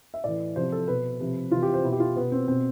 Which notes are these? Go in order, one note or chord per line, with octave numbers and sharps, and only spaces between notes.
E5
A2 E3 D5
C3 F3 C5
A4
B2 B4
C3 F3
C3 E3 F4
G4
C5
B2 E4
G4
F4
B2 B3
C4
B2 C4